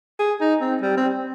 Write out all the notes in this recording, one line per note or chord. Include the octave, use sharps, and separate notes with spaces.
G#4
D#4
C4
G3
C4